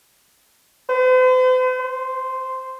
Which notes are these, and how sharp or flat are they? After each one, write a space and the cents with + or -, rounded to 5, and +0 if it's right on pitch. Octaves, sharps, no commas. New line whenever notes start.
C5 -45
C5 -5